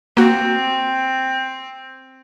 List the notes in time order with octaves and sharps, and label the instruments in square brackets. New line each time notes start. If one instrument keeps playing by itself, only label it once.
[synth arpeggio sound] A#3 F#4 [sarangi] C4